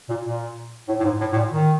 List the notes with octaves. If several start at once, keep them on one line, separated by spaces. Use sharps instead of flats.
A#2
A#2
A2
A2
G#2
A2
A2
A#2
D#3